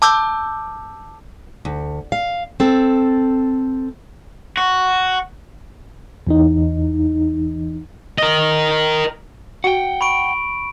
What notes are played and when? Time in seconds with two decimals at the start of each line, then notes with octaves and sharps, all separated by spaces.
0.02 A5 D6 E6 G6
1.65 D2
2.12 F5
2.60 C4 A4
4.57 F#4
6.27 E2 E3 D#4
8.18 A#4 D#5
9.64 F#4 F#5 G5
10.01 B5 C#6 D7